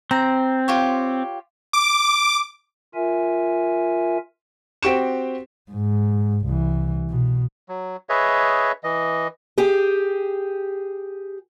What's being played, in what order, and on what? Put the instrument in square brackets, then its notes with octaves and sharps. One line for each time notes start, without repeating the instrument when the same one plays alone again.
[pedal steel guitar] C4 [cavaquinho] A#5
[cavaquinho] F4 G4 C#5
[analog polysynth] D6
[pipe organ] F4 A#4 E5 G#5
[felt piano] C4 F#4 G4 C#6 D7 E7
[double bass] G#2
C2 E3
B2
[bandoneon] F#3
G#4 B4 C#5 D#5 E5
E3 D#5
[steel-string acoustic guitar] G4 G#4